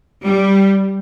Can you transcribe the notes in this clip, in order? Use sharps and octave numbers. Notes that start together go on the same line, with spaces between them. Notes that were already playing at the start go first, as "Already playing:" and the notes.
G3